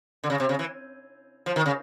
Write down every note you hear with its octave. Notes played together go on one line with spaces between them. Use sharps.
D3
C#3
C3
C#3
E3
F3
D#3
C#3